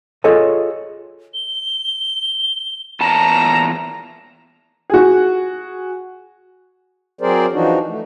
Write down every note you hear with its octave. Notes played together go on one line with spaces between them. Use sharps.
F4 G#4 A4 C#5 D#5 G#5
G7
E2 A#2 A5 A#5 E7
F#4 G#4
F#3 C4 G#4 A#4 C5 D5
E3 F3 D4 D#4 F#4
A3